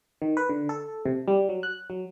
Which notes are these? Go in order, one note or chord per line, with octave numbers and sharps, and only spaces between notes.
D#3
B4
D3
A4
C3
G3
F#3
F#6
F#3